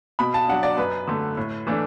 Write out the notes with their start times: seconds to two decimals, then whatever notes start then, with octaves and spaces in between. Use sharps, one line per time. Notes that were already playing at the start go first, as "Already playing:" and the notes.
0.19 B2 B5
0.34 A5
0.48 F#3 D4 F#5
0.63 D5
0.78 F#2 B4
1.07 D3 A3
1.37 A2
1.67 E3 A3 D4